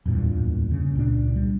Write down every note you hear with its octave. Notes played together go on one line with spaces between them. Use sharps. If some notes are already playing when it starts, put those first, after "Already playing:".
D1 E2 G2 A#2
C#3
C#2 A#2 D4
G3